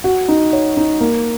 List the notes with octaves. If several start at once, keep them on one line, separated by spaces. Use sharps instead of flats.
F#4
D#4
C#5
D#4
A#3